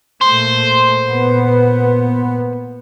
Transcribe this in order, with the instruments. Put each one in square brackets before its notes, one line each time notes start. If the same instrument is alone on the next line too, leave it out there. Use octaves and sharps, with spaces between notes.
[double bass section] A#2 A3 [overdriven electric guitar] C5
[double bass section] A#2 B3